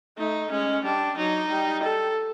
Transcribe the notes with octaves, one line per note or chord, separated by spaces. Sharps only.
A3 D#4
G#3 C#4
G3 D4
F#3 D#4
G3
A4